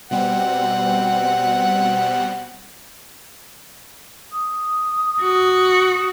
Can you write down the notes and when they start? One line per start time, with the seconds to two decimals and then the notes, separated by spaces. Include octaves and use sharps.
0.11 B2 G3 C4 F#5
4.32 D#6
5.22 F#4